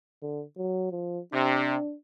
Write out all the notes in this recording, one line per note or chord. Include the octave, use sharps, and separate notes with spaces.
D3
F#3
F3
C3 D4